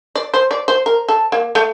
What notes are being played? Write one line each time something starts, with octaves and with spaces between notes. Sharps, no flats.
D5
C5
D5
C5
A#4
A4
A#3
A3